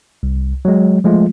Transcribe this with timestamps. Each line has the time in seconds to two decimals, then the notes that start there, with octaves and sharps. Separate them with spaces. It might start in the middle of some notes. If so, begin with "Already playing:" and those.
0.23 C2
0.65 F#3 G#3
1.04 F3 G#3 A3 F4